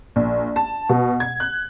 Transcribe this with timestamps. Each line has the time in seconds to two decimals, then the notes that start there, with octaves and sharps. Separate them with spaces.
0.16 A#1
0.56 A5
0.89 B2
1.20 G#6
1.40 F#6